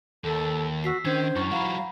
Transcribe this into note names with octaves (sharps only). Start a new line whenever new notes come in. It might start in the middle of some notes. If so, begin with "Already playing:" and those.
D#2 A4
F#4 E6 B6 C7
D#3 C#4 D4 C5 G#6
F#2 E4 C#6
F#3 F4 F5 F#5 A#5 B5